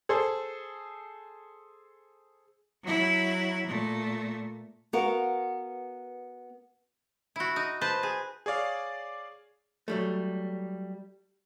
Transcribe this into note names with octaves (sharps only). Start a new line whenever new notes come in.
G#4 A4 C5
F#3 E4
A#2 A3
B3 F#4 A#4 F5
E4 F#4
D#4
B4 C5 A5
G#4
G#4 C#5 D5 F5
F#3 G3 A3